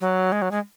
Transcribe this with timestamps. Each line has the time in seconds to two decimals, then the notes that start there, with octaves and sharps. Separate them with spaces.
0.01 F#3
0.32 G#3
0.42 F#3
0.51 G#3